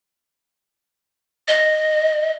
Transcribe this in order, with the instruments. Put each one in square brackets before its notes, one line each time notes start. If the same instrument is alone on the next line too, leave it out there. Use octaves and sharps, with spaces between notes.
[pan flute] D#5